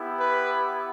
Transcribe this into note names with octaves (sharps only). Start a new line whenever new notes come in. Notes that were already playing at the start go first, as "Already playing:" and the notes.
Already playing: B3 E4 G4
B4